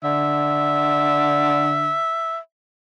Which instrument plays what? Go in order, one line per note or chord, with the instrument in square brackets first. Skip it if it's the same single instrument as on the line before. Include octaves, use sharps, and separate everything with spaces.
[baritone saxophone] D3 [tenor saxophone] E5